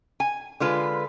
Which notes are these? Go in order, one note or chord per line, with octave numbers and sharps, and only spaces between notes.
G#5
D3 G#3 F4 B4